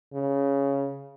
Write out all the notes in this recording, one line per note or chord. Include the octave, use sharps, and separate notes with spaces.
C#3